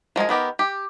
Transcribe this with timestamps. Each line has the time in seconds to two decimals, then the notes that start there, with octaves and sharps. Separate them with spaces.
0.16 F3 G#3 A#4 G#5
0.29 D#3 B3 G4 A#4
0.59 G4